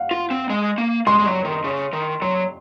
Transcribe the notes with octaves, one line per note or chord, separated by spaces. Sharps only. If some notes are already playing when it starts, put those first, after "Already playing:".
Already playing: F5 F#5
F4
C4
G#3
A#3
G#3 C6
G#3
F#3
D#3
C#3
D#3
F#3 C6